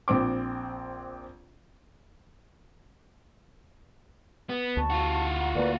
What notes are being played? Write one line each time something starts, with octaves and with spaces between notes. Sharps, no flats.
A#1 C4 D6
B3
D2 A5 C#6
F4 F#4
F#5 A#5
D2 A#3 A#4 B4 D5